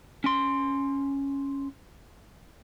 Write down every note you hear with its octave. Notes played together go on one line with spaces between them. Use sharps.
C#4 C6